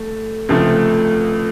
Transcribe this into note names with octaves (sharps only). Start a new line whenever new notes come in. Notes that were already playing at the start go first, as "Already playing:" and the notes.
Already playing: A3
C#2 C3 F3 A3